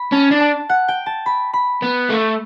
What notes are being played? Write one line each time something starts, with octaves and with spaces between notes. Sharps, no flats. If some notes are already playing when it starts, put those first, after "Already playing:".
Already playing: B5
C#4 A5
D4
A5
F#5
G5
A5
B5
B5
B3
A3